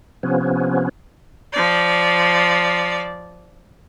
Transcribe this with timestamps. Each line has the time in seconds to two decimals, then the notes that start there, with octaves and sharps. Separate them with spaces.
0.23 C3 F3 B3 C#4
1.52 F3 D5